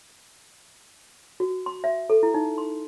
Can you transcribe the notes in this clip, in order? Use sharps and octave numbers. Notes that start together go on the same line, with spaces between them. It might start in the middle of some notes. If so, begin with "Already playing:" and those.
F#4
C6
E5
A4
E4
D#4
C6